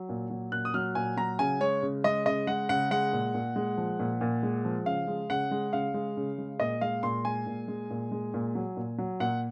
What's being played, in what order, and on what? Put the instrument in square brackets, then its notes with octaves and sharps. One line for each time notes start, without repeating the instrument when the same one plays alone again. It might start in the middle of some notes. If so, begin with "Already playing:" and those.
Already playing: [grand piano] F#3
A#2
F#3
A#2 F#6
D#6
F#3 F6
A#2 G#5
F#3 A#5
C#3 G#5
G#3 C#5
C#3
G#3 D#5
C#3 D#5
G#3 F#5
C#3 F#5
G#3 F#5
A#2
A#2
G#3
F3
A#2
A#2
G#3
F3
C#3 F5
G#3
C#3 F#5
G#3
C#3 F5
G#3
C#3
G#3
A#2 D#5
G#3 F5
A#2 C6
G#3 G#5
A#2
G#3
A#2
G#3
A#2
F#3
A#2
F#3
A#2 F#5